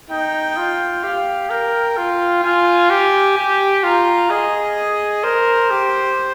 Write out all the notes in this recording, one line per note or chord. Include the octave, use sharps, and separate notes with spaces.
D#4 G5
F4
G4 F5
A#4 G5
F4
F4 G#5
G4
G4
F4 A#5
G#4 D#5
A#4 C5
G4